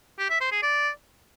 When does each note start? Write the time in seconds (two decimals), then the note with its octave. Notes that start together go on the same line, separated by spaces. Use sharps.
0.19 G4
0.30 E5
0.41 C5
0.52 G#4
0.63 D5